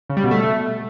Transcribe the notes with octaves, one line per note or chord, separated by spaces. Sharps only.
C#3
G3
B2
A3